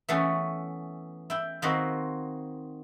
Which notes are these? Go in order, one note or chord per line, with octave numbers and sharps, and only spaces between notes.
E3 A3 B3 C#4 C#5 G#5
E4 G5
D#3 A#3 C4 F#4 B4